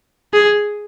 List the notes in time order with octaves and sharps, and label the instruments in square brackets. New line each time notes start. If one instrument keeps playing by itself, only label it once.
[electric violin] G#4